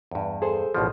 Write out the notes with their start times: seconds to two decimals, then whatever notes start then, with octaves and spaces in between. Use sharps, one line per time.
0.11 E2 G2
0.42 G#4 A4 C5
0.75 A1 B2 F3